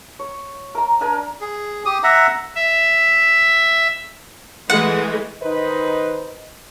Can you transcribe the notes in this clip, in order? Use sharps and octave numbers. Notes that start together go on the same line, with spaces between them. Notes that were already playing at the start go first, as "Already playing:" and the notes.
C#5
A#4 A#5
D4 A#4 G#5
G#4
G4 D#6
E5 F#5 A#5
E5
E3 G#3 A3 F#5
D#3 D#4 B4 C5 D#5